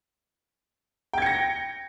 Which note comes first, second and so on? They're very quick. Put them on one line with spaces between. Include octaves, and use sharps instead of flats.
G5 G#6 C#7 A#6